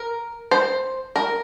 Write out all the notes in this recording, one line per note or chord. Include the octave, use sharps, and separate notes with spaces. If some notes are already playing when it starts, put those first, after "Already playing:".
Already playing: A#4
C5
A#4